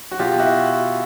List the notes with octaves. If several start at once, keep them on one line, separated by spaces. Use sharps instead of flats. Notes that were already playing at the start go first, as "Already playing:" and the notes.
F#4
B2 F4 G4
E4 F#4